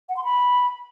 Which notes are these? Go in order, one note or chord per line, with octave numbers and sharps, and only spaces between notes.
F#5
C6
B5